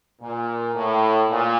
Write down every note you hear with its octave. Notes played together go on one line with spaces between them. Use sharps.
A#2
A2
A#2